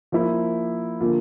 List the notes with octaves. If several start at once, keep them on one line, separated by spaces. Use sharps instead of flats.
F3 A#3 E4
D3 F3 A#3 F4